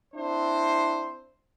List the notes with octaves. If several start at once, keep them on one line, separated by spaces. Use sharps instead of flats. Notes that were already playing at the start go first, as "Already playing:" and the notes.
C4 D4 E4 C5